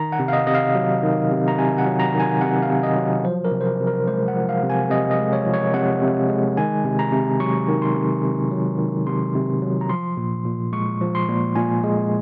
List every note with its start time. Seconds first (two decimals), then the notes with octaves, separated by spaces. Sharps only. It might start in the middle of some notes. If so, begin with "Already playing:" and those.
Already playing: D#3 A#5
0.12 F#5
0.19 C3
0.28 F5
0.33 D#5
0.47 C3 D#5
0.55 F5
0.75 F#3
1.03 D#3
1.31 C3
1.48 A#5
1.58 C3 G#5
1.78 F#5
1.86 F#3
1.99 A#5
2.14 D#3
2.20 G#5
2.41 C3 F#5
2.63 F5
2.69 C3
2.83 D#5
2.96 F#3
3.24 F3 C5
3.45 A#4
3.51 C3
3.61 C5
3.66 A#4
3.80 C3
3.87 A#4
4.07 G#3 C5
4.28 F#5
4.36 F3
4.49 F5
4.63 C3
4.70 G#5
4.90 C3 D#5
5.11 D#5
5.19 G#3
5.33 C#5
5.46 F3
5.54 C#5
5.74 C3 F#5
6.02 C3
6.29 G#3
6.57 D#3 G#5
6.84 C3
6.99 A#5
7.12 C3
7.40 F#3 C#6
7.68 D#3
7.82 C6
7.96 C3
8.23 C3
8.51 F#3
8.78 D#3
9.07 C3 C6
9.35 C3
9.62 F#3
9.81 A#5
9.89 F3 C6
10.17 A#2
10.45 A#2
10.72 G#3 C#6
11.01 F3
11.15 C6
11.29 A#2
11.56 A#2 G#5
11.83 G#3